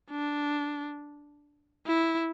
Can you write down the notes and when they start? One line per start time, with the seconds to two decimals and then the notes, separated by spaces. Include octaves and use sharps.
0.10 D4
1.86 E4